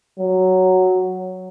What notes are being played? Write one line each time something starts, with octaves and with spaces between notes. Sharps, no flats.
F#3